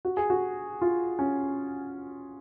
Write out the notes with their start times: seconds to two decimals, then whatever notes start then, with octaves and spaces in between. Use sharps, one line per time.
0.05 F#4
0.17 G#4
0.30 F#4
0.82 F4
1.19 C#4